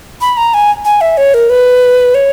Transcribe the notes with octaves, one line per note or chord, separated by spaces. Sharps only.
B5
A#5
G#5
G#5
E5
C#5
A#4
B4
C#5